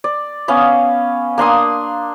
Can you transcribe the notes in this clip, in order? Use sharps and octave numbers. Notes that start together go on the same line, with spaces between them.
D5
B3 C#4 F5
A#3 D4 C6 D#6